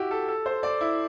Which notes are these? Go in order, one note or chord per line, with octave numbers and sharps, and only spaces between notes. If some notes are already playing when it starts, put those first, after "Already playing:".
Already playing: E4 F#4 G4
A4
A4
C5
D5
E4